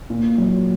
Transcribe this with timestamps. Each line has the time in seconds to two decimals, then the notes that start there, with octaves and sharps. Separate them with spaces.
0.10 A#2
0.38 F#3